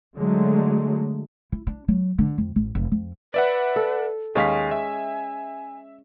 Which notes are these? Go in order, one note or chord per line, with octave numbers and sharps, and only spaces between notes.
D3 F#3 G#3 A3
E4
D4
F#3
D3
F2
A1
F1
F2
B4 D5 E5 F#5
A4
D#2 G#3 C#4 F5 G#5 B6
E5